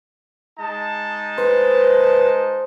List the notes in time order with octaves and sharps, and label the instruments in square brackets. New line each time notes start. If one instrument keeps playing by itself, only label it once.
[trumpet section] G#3 D#4 A5
[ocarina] B4 [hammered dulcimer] C5